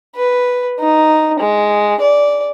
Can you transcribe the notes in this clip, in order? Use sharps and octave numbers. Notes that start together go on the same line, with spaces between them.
B4
D#4
G#3
D5